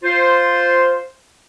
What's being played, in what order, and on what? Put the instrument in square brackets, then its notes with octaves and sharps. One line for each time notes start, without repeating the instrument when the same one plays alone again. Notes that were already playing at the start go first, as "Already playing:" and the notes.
[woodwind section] F4 C5